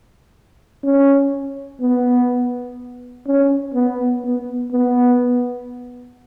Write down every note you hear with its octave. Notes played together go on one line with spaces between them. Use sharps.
C#4
B3
C#4
B3
B3
B3